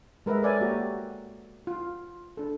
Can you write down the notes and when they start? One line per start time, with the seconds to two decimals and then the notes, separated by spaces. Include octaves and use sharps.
0.26 G#3 A#4 B4 D#5 E5
0.42 A4 A#4 C#5 D5 E5 G#5
0.60 A#3 F#4 G4 A#5
1.67 F4
2.37 D4 A4